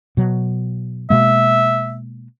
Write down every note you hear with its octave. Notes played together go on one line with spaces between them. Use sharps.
B2 F#3
B2 G#3 A#3 E5